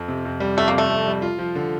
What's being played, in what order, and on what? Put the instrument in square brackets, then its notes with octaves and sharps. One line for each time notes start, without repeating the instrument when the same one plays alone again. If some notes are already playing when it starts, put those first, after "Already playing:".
Already playing: [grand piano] F2
C3
F2
G3
[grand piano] F2 [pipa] A3
[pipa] A#3
[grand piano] C3 [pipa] A3
[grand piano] F2
G3
F4
F3
D3